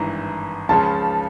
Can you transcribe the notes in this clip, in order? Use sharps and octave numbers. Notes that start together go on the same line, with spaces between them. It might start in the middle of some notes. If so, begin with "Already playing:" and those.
Already playing: G#1 G2 E3 A#5
C#2 C#3 F3 A5